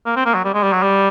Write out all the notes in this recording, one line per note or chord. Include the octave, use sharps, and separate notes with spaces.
A#3
C4
A#3
F#3
G3
G#3
G3
F#3
G3